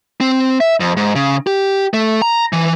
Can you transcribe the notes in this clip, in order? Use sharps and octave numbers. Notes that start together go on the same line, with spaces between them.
C4
E5
F2
G#2
C#3
G4
A3
A#5
E3